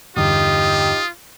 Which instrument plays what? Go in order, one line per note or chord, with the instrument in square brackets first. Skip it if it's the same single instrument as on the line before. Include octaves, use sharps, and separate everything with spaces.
[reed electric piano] E2 G2 D3 [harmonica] D#4 G4 [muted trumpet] F4 [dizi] D#6